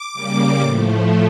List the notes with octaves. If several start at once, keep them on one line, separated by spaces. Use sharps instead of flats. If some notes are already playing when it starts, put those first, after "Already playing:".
Already playing: D6
C#3 G3 A#3
A2 F3 A3